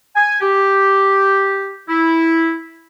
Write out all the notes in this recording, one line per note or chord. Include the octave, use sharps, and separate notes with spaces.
G#5
G4
E4